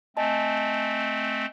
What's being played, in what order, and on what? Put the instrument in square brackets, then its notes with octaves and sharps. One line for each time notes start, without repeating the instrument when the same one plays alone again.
[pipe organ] A3 C4 [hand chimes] D#5 G#5 A5